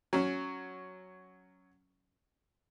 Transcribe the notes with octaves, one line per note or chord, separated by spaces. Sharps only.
F#3 C#4